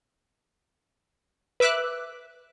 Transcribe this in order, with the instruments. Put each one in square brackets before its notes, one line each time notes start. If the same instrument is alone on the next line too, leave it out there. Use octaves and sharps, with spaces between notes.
[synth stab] B4 E5 D6 E6 F#6